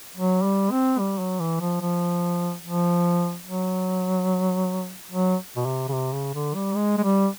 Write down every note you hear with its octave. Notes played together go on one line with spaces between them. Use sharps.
F#3
G3
C4
G3
F#3
E3
F3
F3
F3
F#3
F#3
B2
C3
C#3
C3
C#3
D3
G3
G#3
G#3
G3